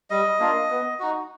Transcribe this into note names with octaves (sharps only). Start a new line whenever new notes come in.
G3 D#5
A#3 D4 F4
B3
D#4 F#4